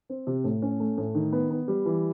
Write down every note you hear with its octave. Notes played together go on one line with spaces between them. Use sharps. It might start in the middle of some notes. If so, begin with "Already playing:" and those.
C4
C3
A2
C#4
A3
A2
D#3
B3
B3
G3
E3